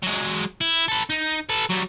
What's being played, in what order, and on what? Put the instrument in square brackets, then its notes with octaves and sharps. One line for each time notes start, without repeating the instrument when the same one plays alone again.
[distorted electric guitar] F#3 G#3
E4
A4 B4
D#4
A4 B4
F#3 G3